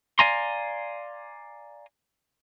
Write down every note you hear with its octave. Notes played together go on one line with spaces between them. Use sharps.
D5 F5 G#5 A#5 C6